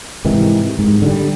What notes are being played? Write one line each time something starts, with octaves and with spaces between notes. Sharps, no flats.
G#2 C3 D#3 E3
G#2
D3 F#3 G3